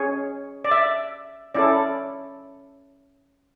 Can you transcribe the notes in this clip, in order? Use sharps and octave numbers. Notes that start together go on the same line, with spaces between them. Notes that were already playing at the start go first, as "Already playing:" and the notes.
Already playing: C#4 G#4 C#5
D5
E5
C#4 E4 A4 D5